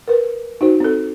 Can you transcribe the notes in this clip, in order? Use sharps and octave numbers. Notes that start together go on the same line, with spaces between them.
A#4 B4
D#4 F#4 C5
C4 A4